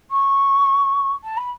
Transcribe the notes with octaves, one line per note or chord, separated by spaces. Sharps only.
C#6
A5
B5